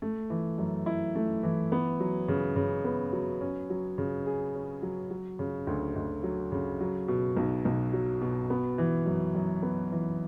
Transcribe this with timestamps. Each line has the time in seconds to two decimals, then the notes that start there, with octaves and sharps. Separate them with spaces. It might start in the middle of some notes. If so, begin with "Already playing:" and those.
0.02 A3
0.30 E3
0.58 F#2
0.86 E4
1.15 A3
1.43 E3
1.72 B3
2.00 F#3
2.28 C#3
2.56 C#3
2.84 B3
3.12 F#3
3.41 C#4
3.70 F#3
3.98 C#3
4.26 G#4
4.55 C#4
4.82 F#3
5.11 F#3
5.39 C#3
5.67 D2
5.96 D2
6.23 F#3
6.52 C#3
6.81 F#3
7.08 B2
7.37 B1
7.65 B1
7.93 F#3
8.21 B2
8.50 B3
8.78 E3
9.06 F#2
9.35 F#2
9.63 B3
9.92 E3